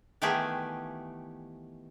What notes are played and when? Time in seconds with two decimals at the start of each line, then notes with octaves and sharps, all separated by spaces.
0.22 D#3 E3 A3 B3 G4 G#4